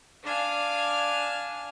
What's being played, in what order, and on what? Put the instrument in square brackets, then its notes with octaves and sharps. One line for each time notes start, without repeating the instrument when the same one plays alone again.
[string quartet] D4 F5 G#5